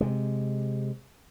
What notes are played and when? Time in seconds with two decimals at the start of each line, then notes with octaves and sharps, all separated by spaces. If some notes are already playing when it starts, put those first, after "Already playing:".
0.01 C3 G#3